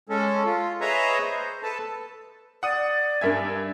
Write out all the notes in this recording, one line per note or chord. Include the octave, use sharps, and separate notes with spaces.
G#3 C#4 A4
F4
G#4 B4 C#5 D#5 E5 A#5
C5
A4 B4 A5
D5 F#5 D#6 D#7
G2 D4 A#4 E5 G#5 G#6